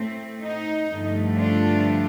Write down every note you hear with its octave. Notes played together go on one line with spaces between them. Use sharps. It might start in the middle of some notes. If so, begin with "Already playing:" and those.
Already playing: A2 A3 C4
D#4
G2 D3 F3 A3
D4 F4